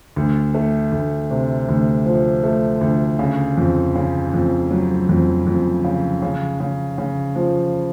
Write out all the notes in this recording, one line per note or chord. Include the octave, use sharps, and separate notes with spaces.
D2
A3
D2
C3
D2
F3
A3
D2
C#3
F2
C#3
F2
F#3
F2
F2
C#3
C#3
C#3
C#3
F3